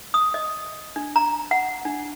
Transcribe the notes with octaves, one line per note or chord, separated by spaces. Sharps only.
D#6
D#5
D4
A#5
F#5
D4